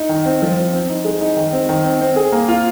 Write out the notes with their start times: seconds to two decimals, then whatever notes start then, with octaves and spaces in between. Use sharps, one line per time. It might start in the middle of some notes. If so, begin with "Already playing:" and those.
Already playing: D#4
0.09 D#3
0.26 C4
0.42 F3
0.57 C4
0.73 C4
0.90 D#4
1.05 G#3
1.21 D#4
1.36 D#3
1.53 C4
1.69 D#3
1.85 C4
2.01 C4
2.16 G#4
2.32 A#3
2.48 F4